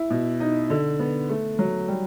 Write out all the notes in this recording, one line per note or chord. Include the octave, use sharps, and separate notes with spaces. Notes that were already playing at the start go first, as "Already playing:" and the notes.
Already playing: E4
B2
D#4
D3
B3
A3
F#3
G3